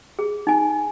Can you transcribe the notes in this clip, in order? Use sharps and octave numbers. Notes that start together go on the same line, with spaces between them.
G#4
D#4 G#5